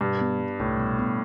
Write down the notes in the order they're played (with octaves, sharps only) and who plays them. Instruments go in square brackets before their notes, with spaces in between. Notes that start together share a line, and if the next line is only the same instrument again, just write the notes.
[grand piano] G2 [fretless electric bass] B2
[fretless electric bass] B3
G3
[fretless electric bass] C2 [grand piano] A2
[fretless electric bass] B2
B3